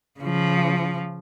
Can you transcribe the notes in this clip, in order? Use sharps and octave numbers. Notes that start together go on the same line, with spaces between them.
C#3 F3